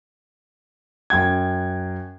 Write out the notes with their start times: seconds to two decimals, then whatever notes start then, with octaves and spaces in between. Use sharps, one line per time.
1.10 F#2 G5 G#6